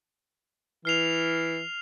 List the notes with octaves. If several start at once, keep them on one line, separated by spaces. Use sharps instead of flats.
E3 F6 C7 F7